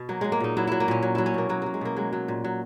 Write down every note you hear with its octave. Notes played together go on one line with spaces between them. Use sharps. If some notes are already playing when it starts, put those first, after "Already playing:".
Already playing: B2
F#3 A#3
F#3 G#3
A#3
A#2 D#4
F#3 E4
F#3 E4
A#3
A#2 C#4
F#3
F#3 E4
C#4
B2 A#3
F#3 A#3
F#3 A#3
G#3
B2 A#3
F#3 G#3
F#3
A#2
F#3